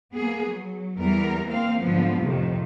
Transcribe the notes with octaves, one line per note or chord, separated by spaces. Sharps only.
A#3 B3 G#4
F#3
E2 E3 G3 B3 A#4
A#3 C4 F5
G#2 D3 F3 F#3 B3
F2 A2 C3 D#3